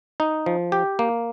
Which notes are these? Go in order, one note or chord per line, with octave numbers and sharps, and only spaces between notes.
D#4
F3
G4
A#3